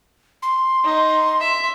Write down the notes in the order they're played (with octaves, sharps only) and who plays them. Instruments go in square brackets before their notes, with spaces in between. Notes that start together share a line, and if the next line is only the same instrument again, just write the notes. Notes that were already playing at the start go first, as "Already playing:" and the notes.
[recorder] C6
[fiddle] D#4
E5